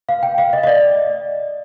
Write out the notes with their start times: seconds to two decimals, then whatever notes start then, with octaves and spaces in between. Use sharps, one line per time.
0.09 F5
0.23 G5
0.38 F5
0.53 D#5
0.63 D#5
0.67 D5